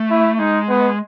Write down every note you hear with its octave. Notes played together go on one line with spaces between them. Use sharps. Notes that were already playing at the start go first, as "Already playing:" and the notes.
Already playing: A3
E4
G#3 D#4
B3